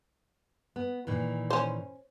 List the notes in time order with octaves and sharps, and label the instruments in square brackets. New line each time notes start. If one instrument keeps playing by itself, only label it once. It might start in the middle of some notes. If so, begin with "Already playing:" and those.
[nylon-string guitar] B3
A#2 D#3 E3
[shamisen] C#4 C5